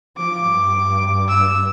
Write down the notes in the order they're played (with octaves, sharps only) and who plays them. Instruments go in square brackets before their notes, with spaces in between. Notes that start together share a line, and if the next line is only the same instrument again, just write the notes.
[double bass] F3 [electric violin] D6
[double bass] G2
[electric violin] E6